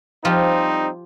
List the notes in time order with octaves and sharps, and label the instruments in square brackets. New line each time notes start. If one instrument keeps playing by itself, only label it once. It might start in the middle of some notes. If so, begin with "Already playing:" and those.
[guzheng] F3 F4 G4 [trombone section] G3 C4 D#4